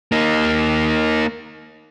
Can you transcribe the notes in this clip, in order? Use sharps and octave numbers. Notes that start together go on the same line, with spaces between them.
A#3 D#4